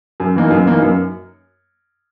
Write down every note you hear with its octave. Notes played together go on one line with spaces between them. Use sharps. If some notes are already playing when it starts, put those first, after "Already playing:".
F#2
E3 A#3 D#4
F#2
E3 A#3 D#4
F#2